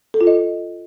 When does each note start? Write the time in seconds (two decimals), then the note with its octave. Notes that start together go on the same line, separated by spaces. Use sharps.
0.14 A4
0.21 F4
0.27 D#5